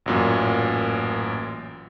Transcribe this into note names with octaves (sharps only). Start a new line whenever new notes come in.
A1 F#2 A#2